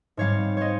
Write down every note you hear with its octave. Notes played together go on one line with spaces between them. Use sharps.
G#2 G3 C4 C#5 F5
C5 C#5 D#5